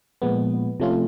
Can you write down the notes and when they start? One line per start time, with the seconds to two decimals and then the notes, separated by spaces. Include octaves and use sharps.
0.22 A#2 F3 G#3 B3
0.80 C3 F3 A3 C#4 F4